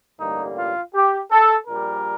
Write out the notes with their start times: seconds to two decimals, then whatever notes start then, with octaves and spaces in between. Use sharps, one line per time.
0.20 A1 G2 D3 G3 A#3 D#4
0.58 F4
0.94 G4
1.31 A4
1.67 A#1 A#2 G3 A#4